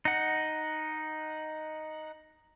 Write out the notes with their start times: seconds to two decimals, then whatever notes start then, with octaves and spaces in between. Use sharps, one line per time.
0.05 D#4 F#5